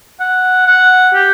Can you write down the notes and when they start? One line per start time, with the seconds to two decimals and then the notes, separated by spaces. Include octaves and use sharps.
0.20 F#5
0.67 F#5
1.14 G4